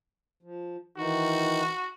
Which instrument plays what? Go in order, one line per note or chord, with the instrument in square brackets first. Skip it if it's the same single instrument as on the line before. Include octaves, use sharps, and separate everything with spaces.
[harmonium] F3
[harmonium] D#3 E3 D#4 [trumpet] F#4